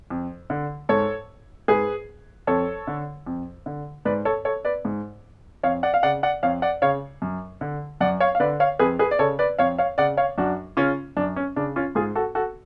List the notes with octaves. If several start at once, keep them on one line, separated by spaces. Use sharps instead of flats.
F2
D3
G#2 A4 C#5
G#2 G#4 B4
F2 A4 C#5
D3
F2
D3
G#2 B4 D5
A4 C#5
A4 C#5
B4 D5
G#2
F2 C#5 F5
D5 F#5
F5
C#3 D5 F#5
D5 F#5
F2 C#5 F5
D5 F#5
C#3 C#5 F5
F#2
D3
F#2 D5 F#5
C#5 F5
F5
D3 B4 D5
C#5 F5
F2 G#4 B4
G#4 B4
D5
C#3 A4 C#5
B4 D5
F2 C#5 F5
C#5 F5
C#3 D5 F#5
C#5 F5
F#2 D4 F#4
C#3 C#4 F4
F#2 D4
C#4
C#3 D4
C#4 F4
G#2 F4 G#4
F#4 A4
F#4 A4